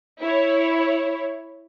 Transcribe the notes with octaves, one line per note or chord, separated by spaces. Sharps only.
E4 C#5